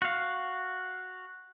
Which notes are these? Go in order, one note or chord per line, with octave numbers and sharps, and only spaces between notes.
F#4 F5